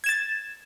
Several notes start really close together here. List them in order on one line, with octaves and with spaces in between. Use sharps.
G#6 E7 A6